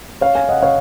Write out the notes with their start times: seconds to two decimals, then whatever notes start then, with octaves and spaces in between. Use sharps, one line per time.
0.21 C#5 F5
0.35 F5 G#5
0.49 D#5 F#5
0.63 C#5 F5